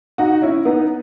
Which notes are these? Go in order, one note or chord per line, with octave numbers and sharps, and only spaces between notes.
D#4 F#4
C#4 E4
B3 D#4